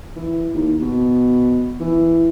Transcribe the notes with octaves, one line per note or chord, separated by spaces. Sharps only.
E3
D#2
B2
E3